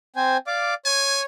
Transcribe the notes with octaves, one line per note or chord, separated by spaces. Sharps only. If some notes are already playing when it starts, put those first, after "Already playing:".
C4 C5 G#5
D5 F5 D6
C#5 G#5